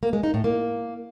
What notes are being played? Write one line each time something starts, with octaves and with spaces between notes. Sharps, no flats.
A#3
G#3
D#4
A2
A#3